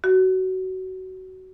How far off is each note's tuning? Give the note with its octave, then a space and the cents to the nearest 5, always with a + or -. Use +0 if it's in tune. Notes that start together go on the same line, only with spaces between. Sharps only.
F#4 +20